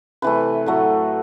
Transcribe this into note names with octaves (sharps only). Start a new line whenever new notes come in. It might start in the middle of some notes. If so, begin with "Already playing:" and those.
C3 E3 A3 B4
A2 F#3 A3